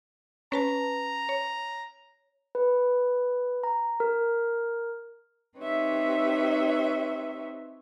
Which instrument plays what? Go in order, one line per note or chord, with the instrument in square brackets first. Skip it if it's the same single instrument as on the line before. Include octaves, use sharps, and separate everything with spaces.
[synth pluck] C#4 B4 A5 [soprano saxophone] A#5
[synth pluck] C#5
[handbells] B4
A#5
A#4
[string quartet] C4 D#4 G4 B4 C#5 E5